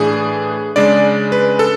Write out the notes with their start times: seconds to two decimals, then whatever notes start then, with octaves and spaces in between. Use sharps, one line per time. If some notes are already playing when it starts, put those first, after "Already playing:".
Already playing: A2 E3 A3 D4 G#4
0.76 C#3 G#3 D4 D5
1.32 B4
1.59 A4